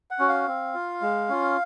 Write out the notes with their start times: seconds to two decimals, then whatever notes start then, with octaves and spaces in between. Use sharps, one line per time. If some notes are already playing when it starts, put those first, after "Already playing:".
0.11 F#5
0.19 C#4 F#4
0.29 F5
0.47 C4
0.74 F4
1.02 G#3
1.29 C#4 F4